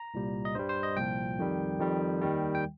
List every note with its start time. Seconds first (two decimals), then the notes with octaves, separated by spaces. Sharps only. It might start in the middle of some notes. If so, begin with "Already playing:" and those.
Already playing: A#5
0.14 C2 A#2 G3
0.45 D#5
0.55 G2 G3 C5
0.69 C5
0.83 D#5
0.97 C2 A#2 F3 G5
1.39 F2 D#3 G3
1.80 F2 D#3 G3
2.22 D#2 D#3 G3
2.55 G5